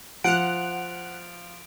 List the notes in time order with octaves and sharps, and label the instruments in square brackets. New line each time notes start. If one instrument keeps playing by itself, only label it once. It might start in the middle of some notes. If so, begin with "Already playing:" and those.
[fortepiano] F3 [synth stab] F#5 F#6 [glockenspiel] D7 F7